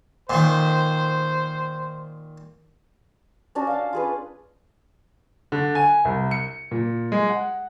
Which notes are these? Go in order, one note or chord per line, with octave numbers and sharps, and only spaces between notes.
A#2 D#3 C5
C#4 D4 F#4
F5 A5
F4 G#4 B4
D3
G#5
C2
C#7
A#2
G#3
F#5